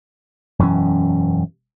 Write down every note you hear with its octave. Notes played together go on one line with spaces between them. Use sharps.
E1 F#2 E3 C#4